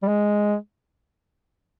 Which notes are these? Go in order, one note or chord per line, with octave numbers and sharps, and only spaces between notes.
G3
G#3